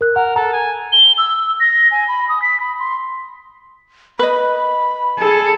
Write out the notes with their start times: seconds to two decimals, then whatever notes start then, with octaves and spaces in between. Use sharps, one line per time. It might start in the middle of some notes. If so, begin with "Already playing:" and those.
0.01 A#4 F#6
0.16 A#4 F#5
0.36 A4 A#5
0.53 G#5
0.92 G7
1.18 E6
1.60 A#6
1.91 G#5
2.08 B5
2.29 D#6
2.42 B6
2.60 B5
2.80 C6
4.19 B4 D#5 B5
5.19 G#4 A4